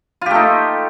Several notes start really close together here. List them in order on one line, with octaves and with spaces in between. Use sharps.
F4 G4 A3 D#4